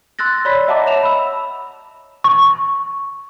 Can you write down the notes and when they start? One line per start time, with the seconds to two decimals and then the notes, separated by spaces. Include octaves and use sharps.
0.19 C6 E6 F#6 A6 A#6
0.45 C#5 D5 B5 E6 A#6 B6
0.68 D#5 E5 F#5 A5 A#5 D6
0.86 C#5 E5 E7 F7
1.03 B5 E6
2.24 C#6